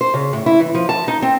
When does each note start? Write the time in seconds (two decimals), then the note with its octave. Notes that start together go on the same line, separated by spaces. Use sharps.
0.01 C5
0.14 C#3
0.33 A2
0.46 E4
0.60 E3
0.75 F3
0.89 A5
1.08 D#4
1.22 C4